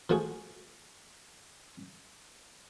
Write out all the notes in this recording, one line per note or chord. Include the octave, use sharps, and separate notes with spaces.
F3 A3 F#4 G#4